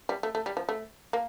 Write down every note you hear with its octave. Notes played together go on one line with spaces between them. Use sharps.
G3
A3
A3
G3
F3
A3
A#3